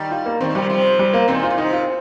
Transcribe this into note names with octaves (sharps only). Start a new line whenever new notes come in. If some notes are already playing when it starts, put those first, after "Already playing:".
Already playing: D#3 G3
F4
A#3
D#3 G3 C4
C3 F3 G3
C3 F3
G3
A#3
A#2 D#3 C4
F4
A#2
C3 D#4
F4